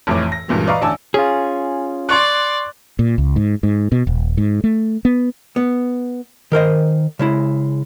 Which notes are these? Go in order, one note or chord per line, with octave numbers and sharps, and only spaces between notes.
F1 F2 A2 E3 C#5 D6
A#6
C#2 G2 A#2 E3 F#3
B4 D5 D#5 F5 A#5 C#6
A1 D3 D5 G#5 A5 E6
C#4 F4 G#4
D5 C6 C#6 F#6
A#2
C#2
G#2
G#2
B2
D#1
G#2
A3
B3
B3
D#3 A#4 C5 D#5
C#3 G#3 E4